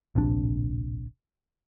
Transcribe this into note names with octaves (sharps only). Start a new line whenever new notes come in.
D1 A#1 C3 D4